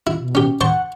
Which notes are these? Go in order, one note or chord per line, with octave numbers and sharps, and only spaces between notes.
E4
B2
C#4 G4
C5 F#5 A5 C#6